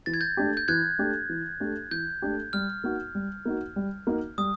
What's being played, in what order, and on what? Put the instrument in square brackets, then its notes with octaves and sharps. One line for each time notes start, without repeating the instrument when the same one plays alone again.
[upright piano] E3 [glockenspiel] A6
[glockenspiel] G#6
G6 A6
[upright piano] A3 D4 G4
[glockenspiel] G6
[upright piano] E3 [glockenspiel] F#6 G#6
[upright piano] A3 D4 G4
E3
A3 D4 G4
[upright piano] E3 [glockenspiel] G6
[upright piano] A3 D4 G4
[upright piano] G3 [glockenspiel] F6
[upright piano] A#3 D#4 F#4
G3
A#3 D#4 F#4
G3
A#3 D#4 F#4
[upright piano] G3 [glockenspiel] D#6